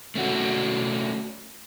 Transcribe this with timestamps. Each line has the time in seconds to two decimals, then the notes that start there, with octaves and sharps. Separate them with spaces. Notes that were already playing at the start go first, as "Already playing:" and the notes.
0.15 A3 C#4 F#4